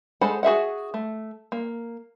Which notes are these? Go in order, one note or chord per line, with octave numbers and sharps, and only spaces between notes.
G#3 A4 C5 F#5 B5
F#4 G#4 E5 F#5
A3
A#3